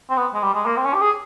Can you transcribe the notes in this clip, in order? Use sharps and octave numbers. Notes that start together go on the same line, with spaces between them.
C4
B3
G#3
G3
G#3
A#3
C4
C#4
G4
G#4